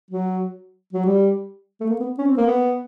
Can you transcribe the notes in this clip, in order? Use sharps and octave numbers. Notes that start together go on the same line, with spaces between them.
F#3
F#3
G3
A3
A#3
B3
C#4
C4
A#3
B3